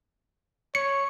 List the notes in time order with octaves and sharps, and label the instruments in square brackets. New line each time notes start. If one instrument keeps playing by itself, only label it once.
[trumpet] C#5 [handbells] C#7